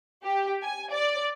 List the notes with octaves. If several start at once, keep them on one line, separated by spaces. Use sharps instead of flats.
G4
G#5
D5